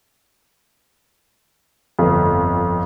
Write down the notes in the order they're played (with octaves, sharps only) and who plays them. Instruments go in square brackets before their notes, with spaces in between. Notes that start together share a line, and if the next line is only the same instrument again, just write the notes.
[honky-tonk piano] G1 F2